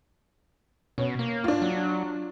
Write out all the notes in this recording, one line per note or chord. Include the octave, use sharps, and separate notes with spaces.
B2 C#4
A#3
D4 F4
F#3